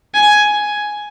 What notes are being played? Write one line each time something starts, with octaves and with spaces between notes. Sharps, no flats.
G#5